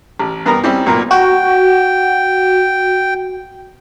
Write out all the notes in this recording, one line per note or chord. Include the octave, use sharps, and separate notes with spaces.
A1
G2 B3 A#4 A#5
G3 C4 C#4 E4 G4
B1 A#2 A#4
F#4 G5